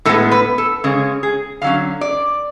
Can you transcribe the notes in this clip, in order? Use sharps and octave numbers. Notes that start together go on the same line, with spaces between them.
A2 G#3 B3 A4
B4
A4
C#3 G#3 C#4
G#4
D3 F#3 C#4 F5
D5